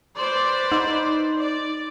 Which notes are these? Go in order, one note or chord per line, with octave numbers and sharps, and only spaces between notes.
B4 C5 D5
D#4
D5